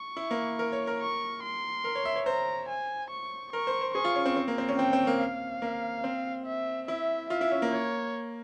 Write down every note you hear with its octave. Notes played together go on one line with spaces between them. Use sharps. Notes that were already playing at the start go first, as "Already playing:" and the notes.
Already playing: C#6
E4
A#3
A#4
C#5
A#4
C#6
C6
A#4
C#5
E5
C#5
C5 A#5
G#5
C#6
A#4 C#6
C5
C5
G#4 C#6
F4
C#4
C4
C4
A#3
C4
C#4
C4 G5
C4
A#3
F5
A#3
C4
E5
E4 E5
F4 E5
E4
C#4
A#3
C#5